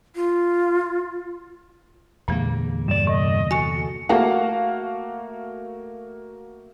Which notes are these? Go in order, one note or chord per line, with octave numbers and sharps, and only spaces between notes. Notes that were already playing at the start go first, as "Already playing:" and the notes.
F4
E2 A#2 D3 G#3 A#3
G2 D5 E7
C3 D#5
F#4 A4 G#5 C#6 C#7
A3 A#3 F#4 F5 F#5